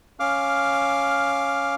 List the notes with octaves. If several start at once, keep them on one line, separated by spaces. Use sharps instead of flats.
C#4 F5 D6 F6